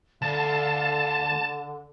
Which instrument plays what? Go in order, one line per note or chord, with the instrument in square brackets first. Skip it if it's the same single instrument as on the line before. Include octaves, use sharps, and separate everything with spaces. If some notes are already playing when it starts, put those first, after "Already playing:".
[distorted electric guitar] D2 [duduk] D3 [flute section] A4 D5 F5 [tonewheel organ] A5